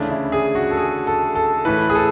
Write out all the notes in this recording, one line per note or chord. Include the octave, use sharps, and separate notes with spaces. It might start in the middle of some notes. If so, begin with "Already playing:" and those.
Already playing: D2 C#3 E3 A3 D4
E4
G#4
F#4
A4
G#4
A4
A4
A2 E3 A3 B4
G#4
A4